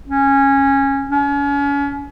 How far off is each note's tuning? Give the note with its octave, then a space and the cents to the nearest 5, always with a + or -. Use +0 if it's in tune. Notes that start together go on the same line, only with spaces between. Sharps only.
C#4 -15
C#4 +35